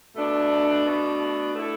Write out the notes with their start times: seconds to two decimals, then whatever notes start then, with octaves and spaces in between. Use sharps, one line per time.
0.16 B2 A3 D4
0.85 B2 A3 D4
1.55 A3 E4 A4